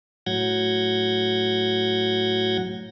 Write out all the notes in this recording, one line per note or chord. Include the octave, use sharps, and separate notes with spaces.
A2 F#3 F#5 G6 G#6 A#6